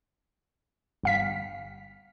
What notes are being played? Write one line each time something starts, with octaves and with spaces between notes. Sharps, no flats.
G1 F5 B6